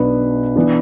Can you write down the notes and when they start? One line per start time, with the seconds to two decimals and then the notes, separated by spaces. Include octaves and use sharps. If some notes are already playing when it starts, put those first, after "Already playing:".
Already playing: B1 B2 B3 D4 B4
0.56 E3 B3 D4